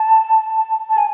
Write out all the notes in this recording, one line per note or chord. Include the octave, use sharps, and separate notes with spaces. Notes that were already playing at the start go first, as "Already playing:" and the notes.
Already playing: A5
A5
G#5